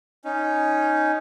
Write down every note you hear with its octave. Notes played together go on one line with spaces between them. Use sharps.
C#4 D#4